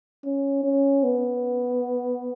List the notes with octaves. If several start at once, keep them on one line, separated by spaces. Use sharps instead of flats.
C#4
C#4
B3